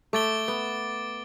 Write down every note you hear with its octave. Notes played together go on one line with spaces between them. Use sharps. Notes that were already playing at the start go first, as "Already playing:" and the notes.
A3 D6 A6 D7 G7
B3